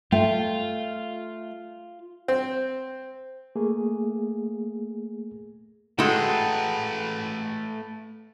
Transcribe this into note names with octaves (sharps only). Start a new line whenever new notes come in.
A3 F4 E5 G5
C4
A3 A#3 G#4
G#3 A3 F#4 A4 B4 G5